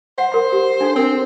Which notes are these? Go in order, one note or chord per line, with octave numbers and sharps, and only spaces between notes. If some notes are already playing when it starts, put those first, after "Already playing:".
C5 F#5
A#4 C6
G4
D4 D#4 A4
C4 D4 A#4